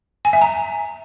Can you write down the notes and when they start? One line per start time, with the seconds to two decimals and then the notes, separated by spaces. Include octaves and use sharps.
0.25 G#5
0.33 E5
0.41 A#5